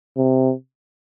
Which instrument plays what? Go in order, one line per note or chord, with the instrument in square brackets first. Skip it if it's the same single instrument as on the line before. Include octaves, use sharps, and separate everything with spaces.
[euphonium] C3